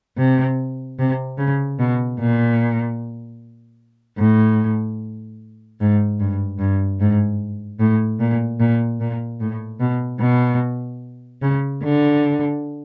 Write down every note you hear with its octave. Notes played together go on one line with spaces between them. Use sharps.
C3
C3
C#3
B2
A#2
A2
G#2
G2
G2
G#2
A2
A#2
A#2
A#2
A2
B2
B2
C#3
D3